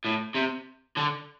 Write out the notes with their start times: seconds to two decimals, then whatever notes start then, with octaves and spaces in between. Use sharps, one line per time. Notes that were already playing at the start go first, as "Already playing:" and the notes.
0.05 A2
0.36 C3
0.97 D3